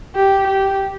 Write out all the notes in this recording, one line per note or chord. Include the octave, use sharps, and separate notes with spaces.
G4
G4